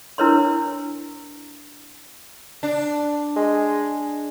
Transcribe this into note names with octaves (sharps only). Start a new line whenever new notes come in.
D4 E4 A#4 B4 C#5 C6
D4
G#3